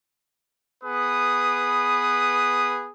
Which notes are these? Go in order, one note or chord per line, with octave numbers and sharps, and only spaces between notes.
B3 G#4 B4 D#6